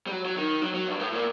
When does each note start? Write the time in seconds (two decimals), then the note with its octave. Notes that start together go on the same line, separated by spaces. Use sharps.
0.07 G3
0.11 F#3
0.25 F#3
0.37 D#3
0.62 F#3
0.74 F#3
0.87 G2
1.00 A2
1.12 A#2